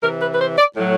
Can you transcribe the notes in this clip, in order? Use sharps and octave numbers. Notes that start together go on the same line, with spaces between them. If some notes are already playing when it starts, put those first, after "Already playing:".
C3 E3 A#4
B4
B4
C5
D5
A2 F#3